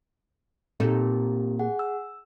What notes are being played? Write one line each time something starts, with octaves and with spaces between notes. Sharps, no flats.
A#2 C4 D#4 G4 A4
G#4 F#5 G#5
E6